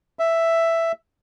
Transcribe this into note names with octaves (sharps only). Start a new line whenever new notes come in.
E5